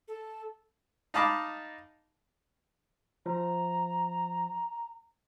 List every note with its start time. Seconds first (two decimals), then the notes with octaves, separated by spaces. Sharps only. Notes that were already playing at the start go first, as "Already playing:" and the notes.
0.08 A4
1.14 D#4 D#5 F5 A5 B5 D6
3.26 F3 A#5